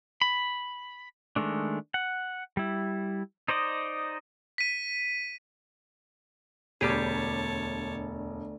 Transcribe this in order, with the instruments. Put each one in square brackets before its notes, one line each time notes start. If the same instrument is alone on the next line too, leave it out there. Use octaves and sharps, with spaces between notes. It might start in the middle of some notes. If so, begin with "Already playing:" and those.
[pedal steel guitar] B5
D#3 G#3 A3 D4
F#5
G3 E4
D#4 C5 D5 D#5
[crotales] B6 D#7
[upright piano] E1 [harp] D2 B5 [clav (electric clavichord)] G3 G4 G#4 [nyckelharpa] C#5 A5